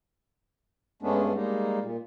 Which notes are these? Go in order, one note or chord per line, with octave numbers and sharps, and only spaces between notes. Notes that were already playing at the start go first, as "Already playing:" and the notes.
G2 G#3 A3 B3 C#4 D4
G3 G#3 A#3 D#4
A#2